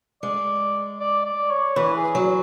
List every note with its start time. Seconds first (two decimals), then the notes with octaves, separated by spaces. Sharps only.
0.23 G#3 D5
0.99 D5
1.25 D5
1.51 C#5
1.76 E3 B4
1.96 G#4
2.15 F#3